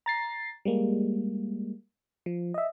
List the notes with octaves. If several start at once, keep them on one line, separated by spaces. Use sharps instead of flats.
A#5 A6 C7
G3 G#3 A#3
F3
D#5 E5